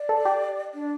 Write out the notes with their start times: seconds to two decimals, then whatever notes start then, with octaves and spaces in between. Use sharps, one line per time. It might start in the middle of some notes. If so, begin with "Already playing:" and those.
Already playing: D5
0.09 A4
0.25 G4
0.74 D4